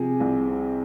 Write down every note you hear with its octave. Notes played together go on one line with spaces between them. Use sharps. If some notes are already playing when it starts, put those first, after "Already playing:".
Already playing: C3 F3 C4 G#4 G#5
C2
C4